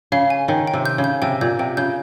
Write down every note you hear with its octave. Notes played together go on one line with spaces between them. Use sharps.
C#3 F5
G#5
D#3 C#5
G5
C3
G6
C#3
G6
C3 G5
A#2 G6
C3 G5
C#3 G6